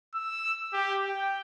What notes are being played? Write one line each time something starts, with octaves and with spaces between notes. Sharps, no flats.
E6
G4
G5